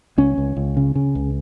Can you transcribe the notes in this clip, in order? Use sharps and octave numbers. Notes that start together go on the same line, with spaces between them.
C#2 C#4
C#2
C#2
C#3
C#3
C#2